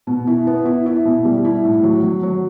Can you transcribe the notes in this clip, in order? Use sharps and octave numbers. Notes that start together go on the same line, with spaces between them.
B2
E4
B3
E4
E4
B2
G3
E4
A2
F#3
F#3
F#3